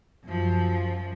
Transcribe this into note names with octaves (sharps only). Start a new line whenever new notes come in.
F#2 F3